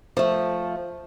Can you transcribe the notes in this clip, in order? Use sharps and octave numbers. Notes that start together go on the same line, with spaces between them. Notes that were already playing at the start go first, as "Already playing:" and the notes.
F3 A3